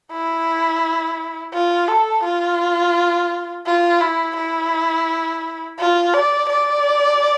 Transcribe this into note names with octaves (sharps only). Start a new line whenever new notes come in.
E4
F4
A4
F4
F4
E4
E4
F4
D5
D5